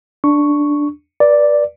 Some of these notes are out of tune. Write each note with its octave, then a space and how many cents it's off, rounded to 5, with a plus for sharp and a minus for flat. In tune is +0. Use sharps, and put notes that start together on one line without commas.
D4 +0 C#6 +0
B4 -35 D5 +0